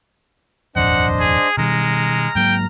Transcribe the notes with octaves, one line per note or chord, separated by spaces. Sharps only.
D#1 G#1 F2 D4 C5 D#5 F#5
G#4
B2 D#3 G3 G#3 A#5 F6
G#2 F#3 A#3 G5